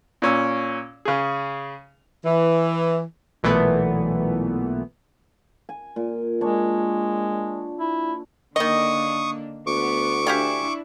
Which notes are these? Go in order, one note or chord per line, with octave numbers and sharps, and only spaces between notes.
A#2 C#4 E6
C#3 G#4
E3
B1 A#2 E3 A3 B3
G#5
A#2
G#3 D4 C#5
E4
D3 D#3 A#3 D4 D#5 C#6 D#6
D2 B3 C#6 D6
D4 E4 G4 F5 G#5